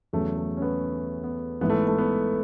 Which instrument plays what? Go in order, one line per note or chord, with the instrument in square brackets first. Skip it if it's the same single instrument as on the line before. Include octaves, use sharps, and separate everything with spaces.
[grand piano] E2 C#3 F#3 A3
A3
C#4
B3
B3
A1 G#2 E3 B3
A3
A3
B3